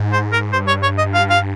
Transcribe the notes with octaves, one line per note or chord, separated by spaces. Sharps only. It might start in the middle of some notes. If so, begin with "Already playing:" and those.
Already playing: G#2
C5
A#4
G2 C5
C#5
C#5
D#5
F5
F5